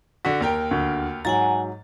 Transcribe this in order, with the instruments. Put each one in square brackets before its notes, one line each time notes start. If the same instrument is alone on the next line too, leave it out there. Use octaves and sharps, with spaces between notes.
[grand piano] D3 F#4 [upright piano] B6
[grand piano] D#2 A#4 G5
[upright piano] D2
[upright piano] G#2 F#3 [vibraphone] F#5 G#5 A#5 [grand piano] A6